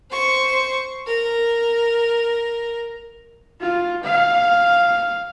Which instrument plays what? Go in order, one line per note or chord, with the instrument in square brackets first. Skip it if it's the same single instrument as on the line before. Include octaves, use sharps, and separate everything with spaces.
[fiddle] C5 C#6
A#4
[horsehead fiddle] F4
F5